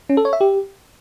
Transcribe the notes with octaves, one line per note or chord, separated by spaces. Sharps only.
C#4
A4
C#5
E5
G4